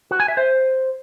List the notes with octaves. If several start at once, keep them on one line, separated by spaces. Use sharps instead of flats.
F#4
G#5
E5
C5